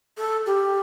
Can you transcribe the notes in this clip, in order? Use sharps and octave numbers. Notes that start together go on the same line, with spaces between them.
A4
G4